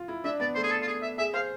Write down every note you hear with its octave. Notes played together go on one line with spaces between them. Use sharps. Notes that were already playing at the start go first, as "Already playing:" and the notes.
Already playing: F4
E4
D4 E5
B3 D5
A3 C5
G#4
A4
F4
G#4
E5
G#4 E5
C5 F5